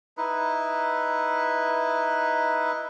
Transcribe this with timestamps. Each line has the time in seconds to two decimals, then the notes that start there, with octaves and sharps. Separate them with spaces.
0.17 D#4 E4 B4